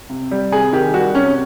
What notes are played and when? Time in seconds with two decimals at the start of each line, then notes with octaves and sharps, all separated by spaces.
0.09 C3
0.31 G3
0.52 C3 G#4
0.73 D#3 G4
0.94 G3 F#4
1.15 C3 C#4